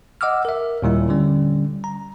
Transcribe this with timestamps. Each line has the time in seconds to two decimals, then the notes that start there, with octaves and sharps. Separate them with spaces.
0.21 D#5 F#5 D6 E6 F6
0.45 A#4 E5
0.82 D#2 A#2 G3 E4
1.09 D3 G3 C#4
1.84 A#5